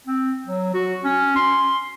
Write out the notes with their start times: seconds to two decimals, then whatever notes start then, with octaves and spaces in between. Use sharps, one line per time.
0.07 C4
0.47 F#3
0.74 F#4
1.04 C#4
1.36 C6